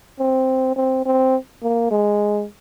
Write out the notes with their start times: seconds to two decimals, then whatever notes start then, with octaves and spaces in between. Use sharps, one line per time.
0.19 C4
0.76 C4
1.06 C4
1.63 A#3
1.91 G#3